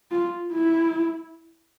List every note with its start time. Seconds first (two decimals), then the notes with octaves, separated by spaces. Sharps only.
0.11 F4
0.53 E4